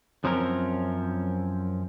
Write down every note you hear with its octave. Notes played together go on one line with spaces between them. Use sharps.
F#2 F3 C4 C#4 A#4